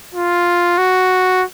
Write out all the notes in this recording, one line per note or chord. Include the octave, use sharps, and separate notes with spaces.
F4
F#4